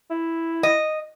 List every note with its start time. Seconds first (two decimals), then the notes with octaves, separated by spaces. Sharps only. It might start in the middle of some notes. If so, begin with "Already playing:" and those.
0.10 E4
0.63 D#5